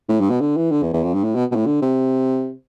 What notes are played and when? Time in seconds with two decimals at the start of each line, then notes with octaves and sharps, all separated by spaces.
0.09 A2
0.20 G2
0.30 B2
0.41 D3
0.57 E3
0.71 D3
0.83 E2
0.93 E2
1.03 F2
1.13 G2
1.24 A2
1.35 B2
1.51 B2
1.55 A2
1.66 D3
1.82 C3